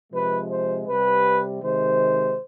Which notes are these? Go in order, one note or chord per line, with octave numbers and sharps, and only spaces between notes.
C3 F3 G#3 B4
C5
C3 G3 B4
C3 D#3 G#3 C5